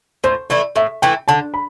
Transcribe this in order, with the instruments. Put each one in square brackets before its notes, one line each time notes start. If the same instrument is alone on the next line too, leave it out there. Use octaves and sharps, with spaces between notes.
[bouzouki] A2 [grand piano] C5
[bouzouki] E3 A3 E4 [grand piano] D5
[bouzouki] A2 [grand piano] E5
[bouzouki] E3 A3 E4 [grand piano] G5
[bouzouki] D3 [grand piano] A5
[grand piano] B5